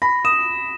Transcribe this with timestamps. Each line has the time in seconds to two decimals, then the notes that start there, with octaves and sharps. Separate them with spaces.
0.02 B5 A#6
0.25 D#6 E7